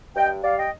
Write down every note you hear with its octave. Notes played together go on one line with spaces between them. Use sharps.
G2 D#5 G5
G3 D5 F5
D#5 G5